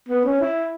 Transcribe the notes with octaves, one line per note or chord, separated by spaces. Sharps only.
B3
C#4
E4